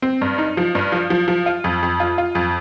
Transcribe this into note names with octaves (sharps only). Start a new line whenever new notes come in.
C4
G2
D#4
F3
G2
F3
F3
F3
F4
F2
F2
F4
F4
F2